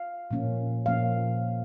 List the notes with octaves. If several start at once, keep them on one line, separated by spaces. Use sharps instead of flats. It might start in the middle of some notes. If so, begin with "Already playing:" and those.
Already playing: F5
A#2 F3 A#3 C#4
A#2 F3 A#3 C#4 F5